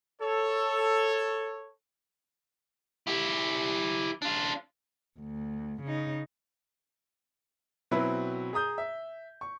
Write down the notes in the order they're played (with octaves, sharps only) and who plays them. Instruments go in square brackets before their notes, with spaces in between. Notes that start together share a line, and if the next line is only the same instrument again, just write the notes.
[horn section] A4 C#5
[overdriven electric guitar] E4 G4
D4 F4
[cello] D2
C#3 D#4
[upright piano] B2 F#3 C4 E4 B4
G#4 A#5 D#6 G6
E5
C#6